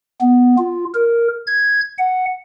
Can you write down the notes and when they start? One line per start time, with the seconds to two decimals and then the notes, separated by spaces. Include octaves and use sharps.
0.21 B3
0.58 F4
0.94 A#4
1.47 G#6
1.98 F#5